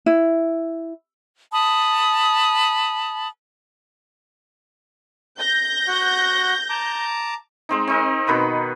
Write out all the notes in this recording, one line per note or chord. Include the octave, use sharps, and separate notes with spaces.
E4
A5 B5 D#6
G6 A#6
F#4 F#5
A5 A#5 D6
G#3 C4 D#4
C4 D#4 A#4
B2 D#3 B4 B5